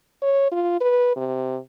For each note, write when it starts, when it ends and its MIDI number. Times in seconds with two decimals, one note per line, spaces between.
0.22 0.51 73
0.52 0.77 65
0.81 1.16 71
1.16 1.57 48